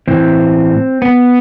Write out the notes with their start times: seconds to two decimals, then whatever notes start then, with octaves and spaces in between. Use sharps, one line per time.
0.08 A2 E3 C4
1.02 B3